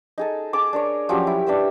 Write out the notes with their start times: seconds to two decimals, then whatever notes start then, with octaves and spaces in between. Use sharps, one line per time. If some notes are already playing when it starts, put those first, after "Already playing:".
0.18 D#4 G#4 A4
0.53 G#4 A5 D6
0.73 D4 A#4 C#5
1.09 F3 F#3 C#4 G4
1.27 E4
1.47 D4 B4 E5 E6